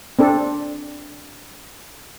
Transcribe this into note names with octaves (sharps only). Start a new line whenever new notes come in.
C4 D4 A4